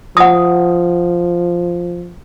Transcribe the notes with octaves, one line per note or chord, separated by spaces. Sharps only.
F3 F#5 D#6